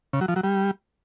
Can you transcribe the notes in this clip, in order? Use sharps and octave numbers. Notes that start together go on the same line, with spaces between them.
C#3
F#3
F3
F#3
G3